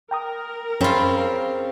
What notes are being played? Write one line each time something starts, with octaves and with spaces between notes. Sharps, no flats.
A#4 G5 A#5 D#6
F#2 C#3 C4 C#4 F4 B5 C#6 E7